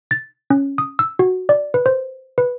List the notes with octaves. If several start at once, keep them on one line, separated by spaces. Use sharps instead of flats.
A6
C#4
D#6
E6
F#4
D5
B4
C5
B4